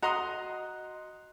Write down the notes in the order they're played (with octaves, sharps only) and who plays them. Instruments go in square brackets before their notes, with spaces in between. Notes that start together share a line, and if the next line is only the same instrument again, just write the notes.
[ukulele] F#4 D#5 A#5 [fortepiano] F#5 C6 D#6